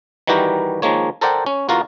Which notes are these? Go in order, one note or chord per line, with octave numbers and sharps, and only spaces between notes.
D#3 E3 G3 F#4 G4 A#4
D#3 F3 G#3 A#3 C#5
A4 A#4 C5 D5 F#5 G5
C#4
E2 F4 F#4 A#4 F5